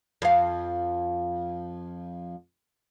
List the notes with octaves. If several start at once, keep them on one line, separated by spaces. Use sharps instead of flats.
F2 F5